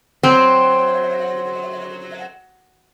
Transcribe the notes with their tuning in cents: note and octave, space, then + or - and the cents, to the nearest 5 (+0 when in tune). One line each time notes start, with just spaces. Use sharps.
F#3 +0 C4 +0